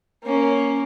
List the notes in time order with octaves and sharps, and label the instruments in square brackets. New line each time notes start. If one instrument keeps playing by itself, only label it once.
[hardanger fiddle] A#3 C#4